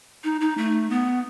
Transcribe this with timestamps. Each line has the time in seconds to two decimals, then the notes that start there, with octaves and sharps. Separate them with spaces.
0.24 D#4
0.41 D#4
0.58 A3
0.90 B3